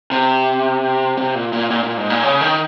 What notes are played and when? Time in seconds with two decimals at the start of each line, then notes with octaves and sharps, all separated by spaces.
0.12 C3
1.17 C3
1.35 A#2
1.53 A#2
1.70 A#2
1.84 A#2
1.97 G#2
2.10 A#2
2.23 C#3
2.41 D#3